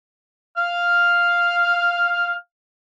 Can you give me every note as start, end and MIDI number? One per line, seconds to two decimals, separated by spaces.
0.57 2.34 77
0.57 2.34 89